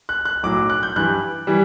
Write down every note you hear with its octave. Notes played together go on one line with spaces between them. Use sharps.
F#6
F#6
B1 A2 F#3 D6
F#6
G6
G2 E3 G3 F#6
E3 G3